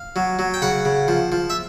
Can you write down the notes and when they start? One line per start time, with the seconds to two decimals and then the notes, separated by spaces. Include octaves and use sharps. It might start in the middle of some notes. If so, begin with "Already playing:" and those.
Already playing: F5
0.16 F#3
0.39 F#3
0.54 G5
0.62 C#3 F#5
0.85 C#3
1.08 F3
1.32 F3
1.50 E5